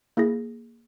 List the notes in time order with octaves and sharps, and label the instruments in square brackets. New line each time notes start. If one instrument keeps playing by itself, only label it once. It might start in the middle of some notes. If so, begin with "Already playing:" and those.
[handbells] A#3 E4 G#4 A#6